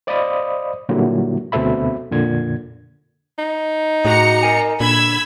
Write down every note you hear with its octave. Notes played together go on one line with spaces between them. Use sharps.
C5 D5 D#5 F5 B5 D#6
A#2 D3 F#3 G3 A#3 E4
D2 B2 C4 A4 E5 B5
F2 A#2 D3 G#6
D#4
A2 F#4 G#4 A#5 C#7
A#4 G#5
A#2 D3 B5 E6 G#6